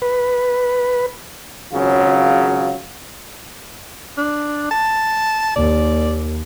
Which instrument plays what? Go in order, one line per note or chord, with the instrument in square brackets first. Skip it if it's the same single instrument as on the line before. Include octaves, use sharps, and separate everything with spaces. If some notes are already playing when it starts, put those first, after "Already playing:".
[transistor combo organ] B4
[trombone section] G#1 C#3 F#3 F4
[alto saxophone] D4
A5
[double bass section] D#2 [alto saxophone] D5